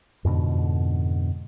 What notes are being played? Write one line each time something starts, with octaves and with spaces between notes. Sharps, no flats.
F2 G#2 B2 D3